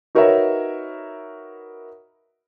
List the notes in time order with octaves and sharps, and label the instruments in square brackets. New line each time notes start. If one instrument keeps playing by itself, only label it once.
[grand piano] D#4 F#4 A#4 B4 C#5 E5